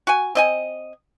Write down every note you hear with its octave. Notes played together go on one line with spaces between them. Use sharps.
F#4 G#5
C4 D#5 G#5